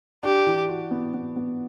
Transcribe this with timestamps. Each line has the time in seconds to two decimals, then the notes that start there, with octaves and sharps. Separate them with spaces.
0.23 D4 G4
0.47 E3
0.69 F#4
0.91 B3
1.14 B3
1.36 B3